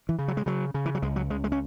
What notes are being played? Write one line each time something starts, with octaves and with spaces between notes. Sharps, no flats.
E3
C#3
F#3
G#3
C#3 F#3
C#3
E3
F#3
C#2 G#3
F#3
C#2 G#3
G#3
C#4